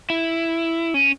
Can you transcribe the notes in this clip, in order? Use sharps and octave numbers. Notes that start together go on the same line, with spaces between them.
E4
C#4